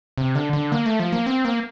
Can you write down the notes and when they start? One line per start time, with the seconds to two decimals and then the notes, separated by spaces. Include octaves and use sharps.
0.18 C3
0.35 D3
0.53 D3
0.72 A#3
0.86 A3
1.00 F3
1.12 A#3
1.26 C4
1.45 A#3